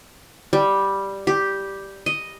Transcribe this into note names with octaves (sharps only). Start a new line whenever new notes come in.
G3
G4
D#5